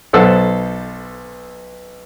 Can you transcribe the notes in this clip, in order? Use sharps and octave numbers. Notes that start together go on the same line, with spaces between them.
B1 B3 A4 C5 F#5 E6